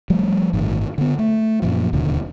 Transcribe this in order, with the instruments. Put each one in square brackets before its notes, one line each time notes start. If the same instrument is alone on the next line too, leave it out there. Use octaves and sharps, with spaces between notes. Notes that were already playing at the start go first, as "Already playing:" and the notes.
[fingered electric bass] F3 G3 A3
G1 A2 D#3
D3 B3
A3
F#2 A#2 F3
D1 D#2 B2 D3